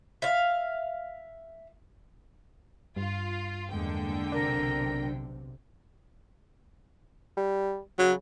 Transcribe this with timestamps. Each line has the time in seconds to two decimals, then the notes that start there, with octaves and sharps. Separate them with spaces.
0.22 E5 F5
2.97 G2 F4
3.71 E2 D3 G#3 A#3 G5
4.32 B1 C3 D4 A#4
7.37 G3
7.99 C#3 F#3